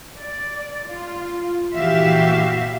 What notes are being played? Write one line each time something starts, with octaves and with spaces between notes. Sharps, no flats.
D5
F4
A#2 E3 F#4 G4 E5 F5